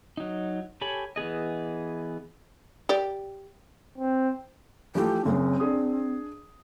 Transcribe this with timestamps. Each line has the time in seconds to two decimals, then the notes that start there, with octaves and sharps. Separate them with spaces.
0.17 F#3 D#4
0.81 G4 A4 C#5 G#5 B5
1.16 E3 B3 G#4 D#5
2.89 G4 D5
3.98 C4
4.95 E3 F3 A3 G4
5.25 F#1 F#2 C4
5.60 D4 G#4 D#6